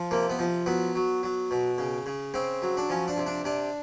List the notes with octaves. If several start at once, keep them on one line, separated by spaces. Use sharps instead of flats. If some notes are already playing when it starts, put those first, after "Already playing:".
Already playing: F3
C3 A#3
B3
F3
F#3 B3
F#3
F#3
B2
C#3
C#3
C#3 C4
F#3
D4
F3 C#4
D4
C3
D4
C3 D4